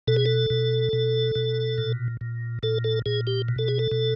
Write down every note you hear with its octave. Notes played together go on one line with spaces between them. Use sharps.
B2 A4
G#4
A4
B2
B2
B2
A#2
A#2
A#2 A4
A4
A#2 G#4
G4
B2
A4
G#4
A4
B2